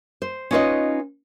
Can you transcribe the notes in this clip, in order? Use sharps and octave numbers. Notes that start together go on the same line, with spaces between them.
C5
C#4 D#4 F4 B4 C#5 D#5